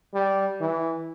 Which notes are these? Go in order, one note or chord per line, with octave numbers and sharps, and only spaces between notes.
G3
E3